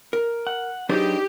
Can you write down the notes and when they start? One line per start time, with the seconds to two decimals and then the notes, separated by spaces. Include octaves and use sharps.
0.13 A#4
0.47 F#5
0.89 F#3 D4 D#4 G4 G#4 B4 C5